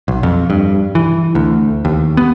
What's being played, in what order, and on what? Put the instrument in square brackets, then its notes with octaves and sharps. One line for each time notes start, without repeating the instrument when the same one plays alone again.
[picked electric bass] B1
F2
G2
E3
D2
D#2
B3